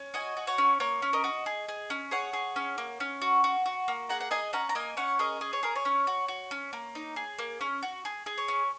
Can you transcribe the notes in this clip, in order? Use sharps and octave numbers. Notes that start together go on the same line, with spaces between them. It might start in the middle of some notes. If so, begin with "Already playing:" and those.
Already playing: C#4
F#4 D#5 G#5
F#4
C#5 F#5
C#4
A#3 C#5
C#4
A#4 D#5
F#4
G#4
G#4
C#4
G#4 C#5 F#5
G#4
C#4
A#3
C#4
F#4
F#4
F#4
A#3
G#4 F#5 A#5
F#5
G#4 D#5 G#5
C#4 F#5 A#5
A#5
A#3 D#5 G#5
C#4 C#5 F#5
G#4 A#4 D#5
G#4 D#5
C#5
G#4 A#4
C#5
C#4
F#4
F#4
C#4
A#3
D#4
G#4
A#3
C#4
F#4
G#4
G#4
C#5
C#4